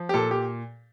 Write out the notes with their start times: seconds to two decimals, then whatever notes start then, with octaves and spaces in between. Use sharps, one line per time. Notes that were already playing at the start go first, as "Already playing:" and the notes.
Already playing: F3
0.09 G4
0.14 A#2 A4
0.31 G4